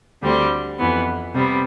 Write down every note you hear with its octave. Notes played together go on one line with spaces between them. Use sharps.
D2 D3 G3 C4 G4
F2 E3 B3
C3 G3 B3